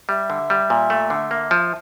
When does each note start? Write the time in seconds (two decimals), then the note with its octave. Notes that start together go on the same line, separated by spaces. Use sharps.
0.09 G3 E5
0.30 D3
0.50 G3
0.70 A#2
0.90 A3
1.10 D3
1.31 A#3
1.51 F3